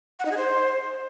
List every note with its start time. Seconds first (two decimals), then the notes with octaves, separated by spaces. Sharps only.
0.19 F#5
0.25 D#4
0.31 G#4
0.37 C5